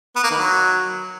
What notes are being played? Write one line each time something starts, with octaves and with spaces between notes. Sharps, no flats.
B3
A#3
D#3
F#3